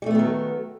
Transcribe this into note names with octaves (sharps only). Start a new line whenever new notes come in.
D#3 F#3 G3 A3 B3